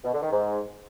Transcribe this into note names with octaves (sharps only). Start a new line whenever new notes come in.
B2
D3
D#3
G#2